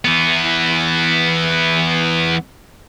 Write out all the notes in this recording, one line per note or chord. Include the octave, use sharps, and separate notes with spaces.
E3 B3